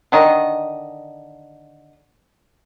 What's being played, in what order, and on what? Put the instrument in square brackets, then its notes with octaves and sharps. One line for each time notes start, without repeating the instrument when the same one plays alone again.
[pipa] D3 D#3 D#5